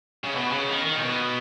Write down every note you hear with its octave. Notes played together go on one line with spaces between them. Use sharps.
C#3
B2
C#3
D#3
D#3
A#2
B2